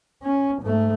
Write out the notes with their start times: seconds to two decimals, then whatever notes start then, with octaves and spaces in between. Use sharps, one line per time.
0.23 C#4
0.62 G#2 A3